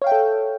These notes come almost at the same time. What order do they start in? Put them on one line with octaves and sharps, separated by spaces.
C#5 F5 G5 E5 A4